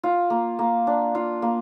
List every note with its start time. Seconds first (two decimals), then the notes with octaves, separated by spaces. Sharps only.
0.03 F4
0.30 A#3
0.59 A#3
0.87 D4
1.15 F4
1.42 A#3